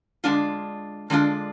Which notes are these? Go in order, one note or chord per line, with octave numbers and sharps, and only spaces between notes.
D3 G#3 D4 F4
D3 G#3 D4 F4